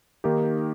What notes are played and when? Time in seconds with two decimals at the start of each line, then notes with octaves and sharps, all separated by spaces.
0.24 D#3 A#3 D#4 G4